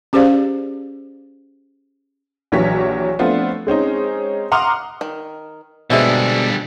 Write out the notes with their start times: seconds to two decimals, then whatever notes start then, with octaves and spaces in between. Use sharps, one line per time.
0.13 C#4 G4 G#4 C5 D5 F5
2.52 A#1 E3 F#3 G4 C#5 B6
3.19 F3 A3 B3 C4 D4 F4
3.67 G#3 C4 C#4 D#4
4.52 F#5 A#5 C6 D6 D#6 F6
5.01 D#3
5.90 B2 D3 G3 G#3 C4 D4 E5